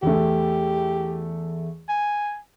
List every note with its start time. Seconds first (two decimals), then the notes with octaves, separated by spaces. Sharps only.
0.03 E2 A3 G4
1.89 G#5